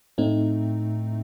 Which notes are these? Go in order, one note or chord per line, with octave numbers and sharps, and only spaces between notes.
A2 A3 C4 D#4